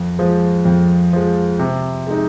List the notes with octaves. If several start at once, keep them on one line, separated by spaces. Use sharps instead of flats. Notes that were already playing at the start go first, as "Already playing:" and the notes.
Already playing: F2
F3 G#3
F2
F3 G#3
C3
G#3 D#4